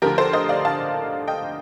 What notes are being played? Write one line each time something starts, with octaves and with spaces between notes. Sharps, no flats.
D2 D3 F3 G4 A#4
A4 C5
C5 D#5
D5 F5
F5 A5
D#5 G5